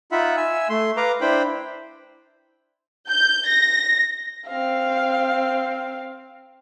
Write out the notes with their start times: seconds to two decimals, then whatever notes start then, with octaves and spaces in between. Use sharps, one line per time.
0.12 D#4 F4 E5 F#5 B5
0.37 E5 G#5 E6
0.69 A3 C6
0.97 B4 F5 A#5 D6
1.21 D4 E4 C5 G5 B5
3.09 G6
3.48 A#6
4.47 C4 F5